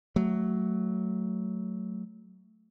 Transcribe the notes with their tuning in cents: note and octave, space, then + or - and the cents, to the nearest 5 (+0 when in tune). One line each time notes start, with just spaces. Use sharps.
F#3 +10 A3 +0